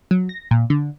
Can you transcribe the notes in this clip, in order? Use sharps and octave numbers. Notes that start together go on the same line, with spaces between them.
F#3
A#6
A#2
D3